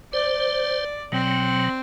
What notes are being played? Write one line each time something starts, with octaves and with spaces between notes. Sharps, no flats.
C5 D5
B2 F#3 C4